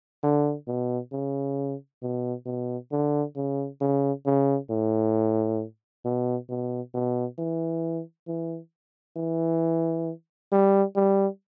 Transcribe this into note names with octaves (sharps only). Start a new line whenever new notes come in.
D3
B2
C#3
B2
B2
D3
C#3
C#3
C#3
A2
B2
B2
B2
E3
E3
E3
G3
G3